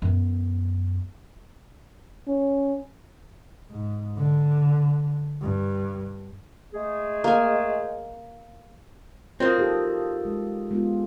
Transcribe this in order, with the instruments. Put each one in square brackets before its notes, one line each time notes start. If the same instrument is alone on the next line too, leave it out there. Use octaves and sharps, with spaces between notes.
[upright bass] F#2 B3
[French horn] C#4
[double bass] G#2
D3
G2
[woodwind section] G#3 A3 G#4
[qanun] A#3 G#5
[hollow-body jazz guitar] A#3 C4 [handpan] F4 F#4 D#5
[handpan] D#4 G4 A4
G#3
G#3 B3 F4